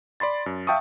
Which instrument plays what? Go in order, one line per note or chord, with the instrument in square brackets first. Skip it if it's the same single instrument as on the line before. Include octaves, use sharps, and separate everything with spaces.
[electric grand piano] D5 B5 C6 A6
F#2
E5 F5 G5 A5 C#6 D#6